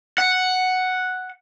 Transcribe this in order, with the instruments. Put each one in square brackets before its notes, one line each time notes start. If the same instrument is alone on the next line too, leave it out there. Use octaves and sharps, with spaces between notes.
[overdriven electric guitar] F#5